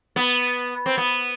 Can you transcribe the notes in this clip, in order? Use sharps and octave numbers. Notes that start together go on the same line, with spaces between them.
B3
C4
B3